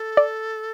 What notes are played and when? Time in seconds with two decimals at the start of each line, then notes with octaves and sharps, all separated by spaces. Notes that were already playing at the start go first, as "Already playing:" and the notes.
Already playing: A4
0.17 D5